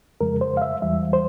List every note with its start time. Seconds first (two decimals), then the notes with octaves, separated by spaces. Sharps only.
0.21 F2 C#3 F3 G#3 A#4
0.41 C5
0.57 F5
0.62 E5
0.82 E2 E3 G3 E5
1.13 C5